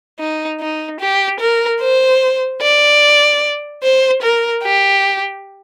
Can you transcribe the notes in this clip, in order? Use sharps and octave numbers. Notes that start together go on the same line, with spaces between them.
D#4
D#4
G4
A#4
C5
D5
C5
A#4
G4